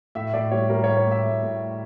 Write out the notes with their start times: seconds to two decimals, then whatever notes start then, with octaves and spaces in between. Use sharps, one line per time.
0.15 A2 E5
0.33 A2 D5
0.51 G3 C#5
0.69 G3 A#4
0.84 C#5
0.88 A2
0.97 C#5
1.07 A2 E5
1.25 A2
1.43 A2